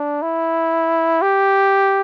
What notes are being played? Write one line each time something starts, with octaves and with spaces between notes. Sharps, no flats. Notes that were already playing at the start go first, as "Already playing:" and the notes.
Already playing: D4
E4
G4